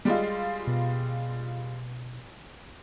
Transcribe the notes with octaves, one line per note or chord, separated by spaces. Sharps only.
G3 G#3 F4
B2